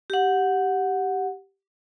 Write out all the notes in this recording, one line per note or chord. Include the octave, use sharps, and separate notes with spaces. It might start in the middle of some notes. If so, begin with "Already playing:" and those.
G4 F#5